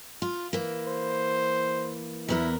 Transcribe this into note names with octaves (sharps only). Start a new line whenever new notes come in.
F4
E3 A#3
C5
E2 B3 E4 A#4